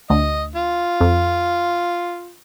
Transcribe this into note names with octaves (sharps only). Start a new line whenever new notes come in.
D2 D#5
F4
F2